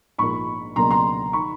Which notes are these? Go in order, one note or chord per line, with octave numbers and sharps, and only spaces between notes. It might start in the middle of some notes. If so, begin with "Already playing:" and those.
A#1 G#2 F3 A#3 B5 C#6
C#2 B2 F#3 A#3 D4 A#5 C6
A#5 C6
D#3 B5 C#6